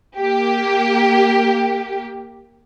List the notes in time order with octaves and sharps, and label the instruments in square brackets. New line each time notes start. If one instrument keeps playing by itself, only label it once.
[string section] A#3 G4